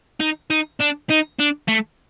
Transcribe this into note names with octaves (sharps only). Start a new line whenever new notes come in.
D#4
D#4
D4
D#4
D4
A3